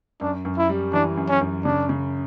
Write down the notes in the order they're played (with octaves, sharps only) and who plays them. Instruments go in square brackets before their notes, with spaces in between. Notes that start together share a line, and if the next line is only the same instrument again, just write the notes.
[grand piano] F#2 [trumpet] D4
[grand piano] F#2
[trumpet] E4
[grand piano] G3
[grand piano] E3 [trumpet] D4
[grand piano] F#2
[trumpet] C#4
[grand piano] F#2
[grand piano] C#3 [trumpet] D4
[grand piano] C#3